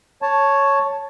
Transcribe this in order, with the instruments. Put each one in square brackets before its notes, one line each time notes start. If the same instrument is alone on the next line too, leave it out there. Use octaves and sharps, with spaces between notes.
[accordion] C#5 A5